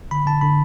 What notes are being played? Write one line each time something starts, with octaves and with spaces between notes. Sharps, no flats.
D3 B5
D3 A5
D3 B5